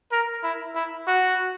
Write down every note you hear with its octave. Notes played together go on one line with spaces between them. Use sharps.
A#4
E4
E4
F#4